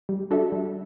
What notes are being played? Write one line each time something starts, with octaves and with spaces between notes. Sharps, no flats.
G3
D4 F#4 A4 E5
G3